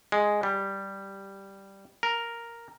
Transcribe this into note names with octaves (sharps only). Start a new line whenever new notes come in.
G#3
G3
A#4